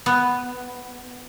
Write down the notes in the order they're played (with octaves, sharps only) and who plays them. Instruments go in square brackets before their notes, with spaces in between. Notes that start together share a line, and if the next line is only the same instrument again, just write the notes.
[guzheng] B3